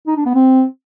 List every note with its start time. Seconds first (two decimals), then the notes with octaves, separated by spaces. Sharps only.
0.07 D#4
0.16 D4
0.25 B3
0.35 C4